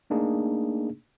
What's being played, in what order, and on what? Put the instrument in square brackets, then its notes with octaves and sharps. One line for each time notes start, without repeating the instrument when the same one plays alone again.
[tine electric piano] A3 A#3 D4 D#4 G#4